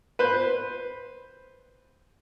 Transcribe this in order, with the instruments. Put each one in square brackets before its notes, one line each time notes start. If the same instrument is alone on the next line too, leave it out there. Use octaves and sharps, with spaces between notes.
[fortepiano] B4 C5